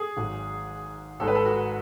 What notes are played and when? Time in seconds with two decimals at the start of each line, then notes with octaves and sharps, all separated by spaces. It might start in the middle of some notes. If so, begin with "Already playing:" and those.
Already playing: G#4
0.17 G#1 G#2 F#3
1.20 G#1 G#2 G#3 A4
1.28 B4
1.35 A4
1.45 F#4